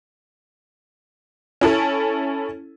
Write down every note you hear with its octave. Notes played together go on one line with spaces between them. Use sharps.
C#4 E4 A4